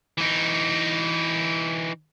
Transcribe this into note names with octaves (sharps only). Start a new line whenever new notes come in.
E3 D#4